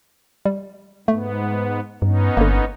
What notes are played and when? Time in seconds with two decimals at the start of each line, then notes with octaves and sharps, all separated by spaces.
0.45 G3
1.08 G#2 A3 B3
2.02 G2 B3 C#4 D#4
2.37 G1 D3 A#3